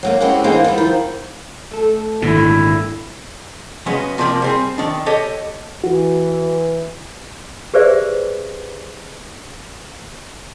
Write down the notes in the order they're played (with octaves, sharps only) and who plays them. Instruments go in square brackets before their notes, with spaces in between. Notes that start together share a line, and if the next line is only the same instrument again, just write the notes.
[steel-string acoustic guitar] F#3 A3 A#3
G#3 C4 C#4 E4 F#4 G4
D3 E3 G#3 A#3 C4 D#4
G3 B3 E4
D#3 F3
[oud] A3 A4
[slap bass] G#1 A#2 D3 [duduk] E4
[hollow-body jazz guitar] C#3 F#3 G#3 B3 C#4
C3 F3 G3 G#3 A#3
G3 C4 G#4
D#3 D4
G4 A4 C#5 D#5
[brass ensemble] E3 [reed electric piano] F#4
[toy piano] G4 G#4 B4 C5 D5 E5